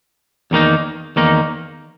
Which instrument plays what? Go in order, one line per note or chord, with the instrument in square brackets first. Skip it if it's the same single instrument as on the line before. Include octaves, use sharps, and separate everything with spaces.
[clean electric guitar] E2 D#3 A#3 D#4
E2 D#3 A#3 D#4